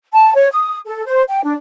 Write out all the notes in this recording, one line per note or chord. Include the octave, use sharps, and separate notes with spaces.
A5
C#5
D#6
A4
C5
G5
D4